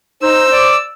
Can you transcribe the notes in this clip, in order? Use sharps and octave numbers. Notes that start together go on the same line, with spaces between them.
D#4 C5 E6
D5 D6